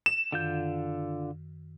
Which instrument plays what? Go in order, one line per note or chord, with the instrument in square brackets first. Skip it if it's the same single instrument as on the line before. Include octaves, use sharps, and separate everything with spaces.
[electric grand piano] E7
[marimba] F#2 D#3 [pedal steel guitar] D3 F4 G6